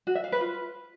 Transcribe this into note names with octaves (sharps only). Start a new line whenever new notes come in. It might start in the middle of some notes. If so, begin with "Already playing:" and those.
F#4
E5
F5
B4
F4